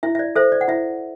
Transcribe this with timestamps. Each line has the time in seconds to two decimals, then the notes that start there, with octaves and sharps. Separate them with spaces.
0.03 E4 E5
0.15 E5
0.19 D5
0.36 A4 C5 E5
0.52 D5
0.61 F#5
0.68 E4 E5